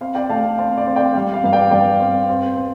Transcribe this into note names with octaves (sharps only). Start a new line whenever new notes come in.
C4 F5
D5 G5
A3 F5 A5
C4 F5
D5
C4
D5 G5
G3 F5
F5
G2 F5
D5 G5
G2 D5 G5
C4
C4
C4